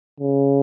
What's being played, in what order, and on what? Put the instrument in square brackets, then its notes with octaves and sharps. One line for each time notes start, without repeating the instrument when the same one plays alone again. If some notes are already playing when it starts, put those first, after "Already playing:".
[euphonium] C#3